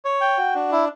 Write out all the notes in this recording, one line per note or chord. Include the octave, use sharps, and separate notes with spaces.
C#5
G5
F#4
D4
E4